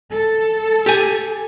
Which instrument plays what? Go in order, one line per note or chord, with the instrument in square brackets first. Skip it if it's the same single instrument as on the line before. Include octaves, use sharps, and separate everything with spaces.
[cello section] A4
[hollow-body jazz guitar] G4 G#5